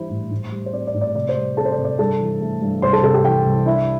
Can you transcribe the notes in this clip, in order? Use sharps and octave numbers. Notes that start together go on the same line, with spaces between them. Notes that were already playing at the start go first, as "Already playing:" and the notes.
Already playing: E3 G3 D4 E4 C5
A2
A2
G3
C5
C4 D5
D5
A2
D5
C3 D5
C5
G3
C4 A4 A5
C5
D5
C3
D5
G2 A4 A5
E3
A3
G2
C2 C5 C6
A4 A5
C3 A4 A5
G4 G5
E3 G4 G5
C2
D4 E4 E5